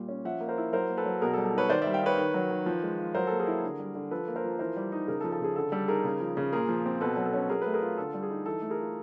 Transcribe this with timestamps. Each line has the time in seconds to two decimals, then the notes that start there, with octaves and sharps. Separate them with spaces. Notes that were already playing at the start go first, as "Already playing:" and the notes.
Already playing: A#2 G3
0.09 C#4
0.25 F3 E5 F#5
0.41 A#3
0.49 A#4 C5
0.58 E4
0.73 F#3 A#4 C5
0.90 A#3
0.97 A4 B4
1.06 F#3
1.21 B2 G#4 A#4
1.33 A4
1.38 G3
1.45 A4
1.54 D#4 B4 C#5
1.69 D#3 C5 D5
1.82 D5 E5
1.87 G3
1.94 F5 G5
2.03 D#4 B4 C#5
2.18 D#3
2.34 F#3
2.50 D#3
2.66 F3
2.83 G#3
2.98 F4
3.14 F#3 A#4 C5
3.27 A#3 A4
3.39 G#4 A#4
3.47 E4
3.63 D3
3.79 G3
3.95 D3
4.11 F3 A4 B4
4.28 A#3
4.36 A#4 C5
4.44 F3
4.59 E3 A#4 C5
4.76 G3
4.92 D#4
5.07 C#3 G#4 A#4
5.21 A4
5.24 F3
5.32 A4
5.41 C#3 G#4
5.56 D3 A4
5.72 G3 A4
5.88 D#4 G#4 A#4
6.04 C#3
6.20 F3
6.37 C#3
6.53 A#2 G#4 A#4
6.69 F3
6.86 C4
7.01 B2 A4 B4
7.17 F#3
7.25 A4
7.34 C#4
7.49 F#3 G#4 A#4
7.62 A3 B4
7.74 G#4 A#4
7.82 F4
7.98 D3 A4
8.14 G3
8.23 G#4
8.30 D#4
8.46 E3 A4
8.62 A3
8.70 G#4 A#4
8.79 F4